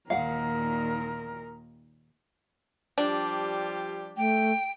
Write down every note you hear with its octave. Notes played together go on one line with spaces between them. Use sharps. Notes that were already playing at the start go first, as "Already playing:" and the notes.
D#2 A#2 D#3 A#4 F5 F#5
F3 G3 D4 G4
A3 G5